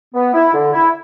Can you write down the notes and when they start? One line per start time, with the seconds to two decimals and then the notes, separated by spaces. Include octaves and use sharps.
0.14 B3
0.34 E4
0.54 D3
0.73 E4